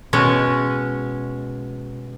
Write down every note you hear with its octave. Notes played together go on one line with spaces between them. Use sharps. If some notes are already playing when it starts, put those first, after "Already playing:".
B2 G#3 C#4